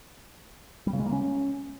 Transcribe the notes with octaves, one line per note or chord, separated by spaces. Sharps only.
G3
C#3
G#3
A#3
C#4